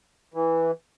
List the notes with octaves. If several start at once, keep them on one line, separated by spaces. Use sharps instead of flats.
E3